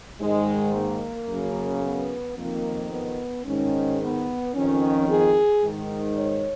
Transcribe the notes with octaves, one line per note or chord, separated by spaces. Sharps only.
G#2 D#3 G#3
A#3
F#2 C#3
B3
F2 D#3 A#3
B3
G#2 D#3 C#4
B3
F2 D#3 C#4
G#4
G#2 D#3
C#5